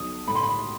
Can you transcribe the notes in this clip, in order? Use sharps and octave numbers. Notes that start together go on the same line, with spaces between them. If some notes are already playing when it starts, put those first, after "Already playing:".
Already playing: B1 D#6
A2 B5
C6
B5